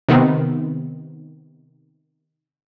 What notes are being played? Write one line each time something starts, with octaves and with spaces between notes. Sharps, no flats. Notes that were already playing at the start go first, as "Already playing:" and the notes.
C3 D#3 B3 C4